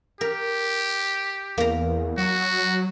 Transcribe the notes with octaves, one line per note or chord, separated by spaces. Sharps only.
G4 A#4
E2 A#3 A#5
F#3 F#4